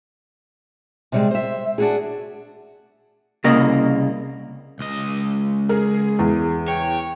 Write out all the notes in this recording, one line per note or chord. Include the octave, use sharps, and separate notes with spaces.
C3 G3 G#3
C5 E5
D4 F#4 G#4
C2 C#3 A#3 D#5
C#2 D#5
G#4 A#4
E2
C#5 G5